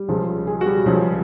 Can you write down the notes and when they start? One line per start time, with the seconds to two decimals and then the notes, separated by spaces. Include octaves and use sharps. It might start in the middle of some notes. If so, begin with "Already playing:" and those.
Already playing: G3 G4
0.08 C#2 C#3 F3
0.47 G#3 G#4
0.61 F#4
0.66 G3 G4
0.86 C#2 C#3 F3